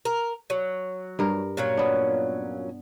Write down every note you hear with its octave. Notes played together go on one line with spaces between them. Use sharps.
A#4
F#3
G2 A#4
A#2 F#3 C#4
B3 D4